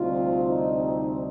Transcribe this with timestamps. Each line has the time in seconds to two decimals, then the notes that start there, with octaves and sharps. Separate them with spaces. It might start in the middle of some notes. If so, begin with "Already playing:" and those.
Already playing: D2 C3 G3 C4 D#4 F4
0.47 D#4